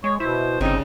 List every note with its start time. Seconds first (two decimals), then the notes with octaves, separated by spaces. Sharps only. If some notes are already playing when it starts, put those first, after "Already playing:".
0.04 G#3 C#5
0.20 B2 E4 C5
0.61 G1 C#3 G3 C4 D#4